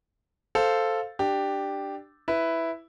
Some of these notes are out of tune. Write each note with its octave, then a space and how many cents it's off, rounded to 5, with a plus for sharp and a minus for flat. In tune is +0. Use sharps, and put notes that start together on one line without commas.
A4 +0 C5 +0 F5 +0
D4 +15 G4 +0
E4 +0 B4 +5